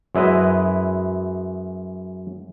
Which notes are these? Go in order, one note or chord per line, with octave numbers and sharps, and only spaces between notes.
F#2 G#3 E4 B4 D#5